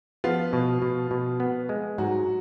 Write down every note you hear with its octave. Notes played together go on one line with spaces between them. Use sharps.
F3 B3 F4
B2
B2
B2
B3
G#3
G#2 F#3 F#4